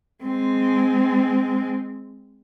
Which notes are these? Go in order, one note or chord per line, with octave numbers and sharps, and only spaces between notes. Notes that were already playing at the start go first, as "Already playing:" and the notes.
G#3 C4